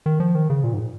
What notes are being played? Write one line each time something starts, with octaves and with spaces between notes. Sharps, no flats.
D#3
F3
D#3
C#3
A#2
G#2